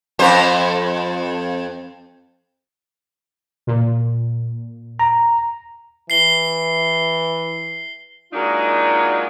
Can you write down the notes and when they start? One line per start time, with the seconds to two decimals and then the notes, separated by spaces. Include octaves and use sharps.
0.19 F2 C5
3.67 A#2
4.99 A#5
6.10 E3 C7 G7
8.32 F#3 G#3 A#3 D4 D#4 F4